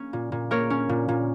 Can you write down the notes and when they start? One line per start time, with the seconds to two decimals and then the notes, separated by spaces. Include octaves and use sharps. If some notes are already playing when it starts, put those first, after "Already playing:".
Already playing: A#3 C#4
0.13 A#2
0.32 A#2
0.51 A#3 A#4 C#5
0.70 C#4
0.89 A#2
1.08 A#2